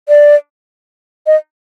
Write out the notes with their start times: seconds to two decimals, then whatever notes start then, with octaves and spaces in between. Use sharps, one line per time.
0.09 D5
1.27 D#5